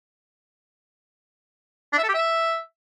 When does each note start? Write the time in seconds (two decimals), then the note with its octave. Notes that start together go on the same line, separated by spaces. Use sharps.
1.93 D4
1.98 E5
2.03 A4
2.09 G4
2.14 E5